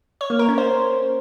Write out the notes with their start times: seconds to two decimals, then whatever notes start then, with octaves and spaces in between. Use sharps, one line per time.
0.21 C#5
0.30 A#3
0.39 A#4
0.48 C#4
0.58 C5